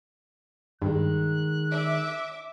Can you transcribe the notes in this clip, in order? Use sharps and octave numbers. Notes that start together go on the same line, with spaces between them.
G2 D#3 G#3 F#6
E5 D6